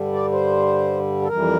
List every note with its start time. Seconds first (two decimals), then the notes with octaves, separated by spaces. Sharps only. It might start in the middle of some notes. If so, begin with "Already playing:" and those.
Already playing: G2 D3 G3
0.13 D5
0.32 C5
1.22 A4
1.28 F2 E3 G3 A#4